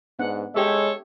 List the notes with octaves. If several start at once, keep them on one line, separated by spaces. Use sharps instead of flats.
G#2 B3 D4 F#5
G#3 G4 A4 C#5 E5